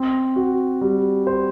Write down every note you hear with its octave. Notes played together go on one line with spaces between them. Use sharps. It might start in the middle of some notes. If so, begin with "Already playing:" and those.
Already playing: C4
F#4
G3
C5